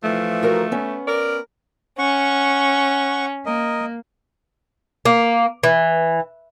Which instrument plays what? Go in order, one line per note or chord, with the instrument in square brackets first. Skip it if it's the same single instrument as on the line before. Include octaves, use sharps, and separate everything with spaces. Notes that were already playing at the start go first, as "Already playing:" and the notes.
[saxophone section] E3 F3 [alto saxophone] A3
[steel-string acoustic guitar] F#4 A#4 A#5
B3 C#4
[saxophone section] A#4 [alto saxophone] D5
[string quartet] C#4 [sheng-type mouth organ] F#5 C#6
[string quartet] A#3 [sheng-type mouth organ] A#4 D#5
[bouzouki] A#3
E3